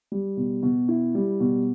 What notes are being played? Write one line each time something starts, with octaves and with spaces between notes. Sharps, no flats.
G3
B2
B2
E4
G3
B2